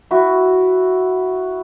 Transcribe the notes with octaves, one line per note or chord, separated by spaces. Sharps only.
E4 F#4